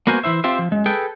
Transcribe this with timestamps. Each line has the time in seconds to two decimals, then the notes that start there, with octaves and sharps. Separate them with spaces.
0.07 A#3 B3 F#4 A#4 C5 G#5
0.24 E3 E4 C5 E5
0.44 C4 F4 G4 C5 E5
0.59 F3
0.71 F#2 G#3
0.86 G#4 A4 B4 G5